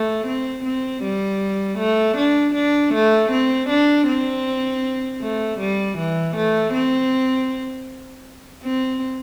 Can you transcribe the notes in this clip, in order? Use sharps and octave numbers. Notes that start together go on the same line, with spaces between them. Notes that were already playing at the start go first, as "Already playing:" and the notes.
Already playing: A3
C4
C4
G3
A3
D4
D4
A3
C4
D4
C4
A3
G3
E3
A3
C4
C4